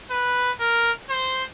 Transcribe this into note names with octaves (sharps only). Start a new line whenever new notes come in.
B4
A#4
C5